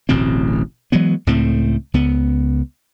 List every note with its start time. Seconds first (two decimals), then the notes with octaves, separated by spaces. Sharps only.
0.09 D1 A1 B2 C4
0.92 E3 F#3 G#3 B3
1.27 C#2 A2 A3 C4
1.94 C#2 B3